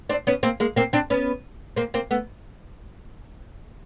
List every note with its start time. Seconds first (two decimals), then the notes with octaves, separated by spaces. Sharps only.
0.09 C4 D4
0.27 B3 C#4
0.43 A#3 C4
0.60 G#3 A#3
0.76 A#3 C4
0.93 C4 D4
1.10 B3 C#4
1.76 A#3 C4
1.94 A#3 C4
2.11 A3 B3